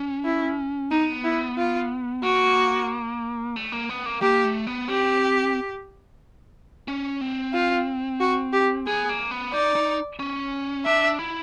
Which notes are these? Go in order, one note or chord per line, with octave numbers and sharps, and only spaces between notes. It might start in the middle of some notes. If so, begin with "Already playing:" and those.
Already playing: C#4
E4
B3 D#4
E4
F4
A#3 F#4
A3
A#3
B3
A#3
A#3 G4
A3
B3
C4 G4
C#4
C4
F4
F#4
G4
B3 G#4
A#3
B3
D#4 D5
D#4
C#4
D4 E5
E4